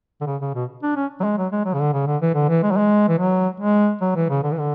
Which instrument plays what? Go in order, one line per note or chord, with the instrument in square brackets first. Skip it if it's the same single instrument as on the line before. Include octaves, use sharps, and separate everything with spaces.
[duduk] D3
C#3
C#3
B2
D4
C#4
F#3
G#3
F#3
G#3
F#3
C#3
D3
C#3
D3
E3
D3
E3
G#3
F#3
G#3
E3
F#3
G#3
F#3
E3
C#3
D3
E3
D3